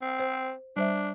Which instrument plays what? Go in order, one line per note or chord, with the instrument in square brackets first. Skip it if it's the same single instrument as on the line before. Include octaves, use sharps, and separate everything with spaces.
[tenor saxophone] C4
[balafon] C5
[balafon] G3 C5 E5 [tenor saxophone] D4